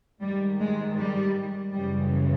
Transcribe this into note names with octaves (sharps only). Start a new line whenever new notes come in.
G#2 D#3 G3
G#3
G3
F#2 C#3 E3 G3